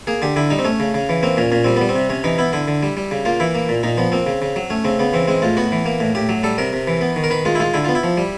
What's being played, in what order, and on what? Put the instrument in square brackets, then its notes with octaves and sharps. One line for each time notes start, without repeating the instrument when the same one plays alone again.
[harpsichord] A#3 G#4
D3 G4
D3 E4
G3 D#4
C4
A3 C#4
C#3
C#3
E3
A#3 C4
A#2 C#4
A#2 C#4
G3 C4
G3 B3
C4
C3
C3 C#4
E3 D#4
B3 E4
D3 E4
D3
G3
G3
C#3
A#3 F4
E3 E4
A#3
A#2
A#2 D#4
F3 B3
A#3 C4
C#3
C#3
F#3
A3 C#4
C#3 C4
C#3 B3
E3 C4
G#3 C4
A2 F4
B3 F#4
E3
A#3
A2
A2 G4
F#3
G3 A4
C3 A#4
C3
E3
B3
D#3
A#4
D#3 B4
G#3 F4
E4
G#3 F4
D3 E4
B3 F4
E4
F3
G3